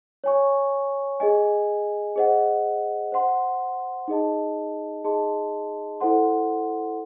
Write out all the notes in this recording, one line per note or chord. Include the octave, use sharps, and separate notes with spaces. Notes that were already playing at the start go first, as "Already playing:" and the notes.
C#5 G#5 C#6
G#4 D#5 G#5
G#4 C5 D#5 F#5
C5 F#5 C6
D#4 G#4 D#5 A5
D#4 G#4 D#5 A5 C6
E4 A4 C5 F#5 C6